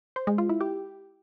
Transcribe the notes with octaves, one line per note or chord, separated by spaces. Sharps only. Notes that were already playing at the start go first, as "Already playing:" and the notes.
C5
G#3
F4
E4
G4